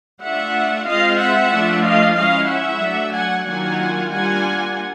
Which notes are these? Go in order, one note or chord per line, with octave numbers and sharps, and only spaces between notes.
A3 D4 F4 E5 F#5
G#3 C4 F4 D#5 F5
E5 F#5
F3 A3 D4 F4
D#5 F5
G#3 C#4 E4 D#5 F5
E5 F#5
F#3 A3 D4
F#5 G#5
D#3 F#3 A#3 D4 F4 F#5 G#5
G3 A#3 D4 F4 F#5 G#5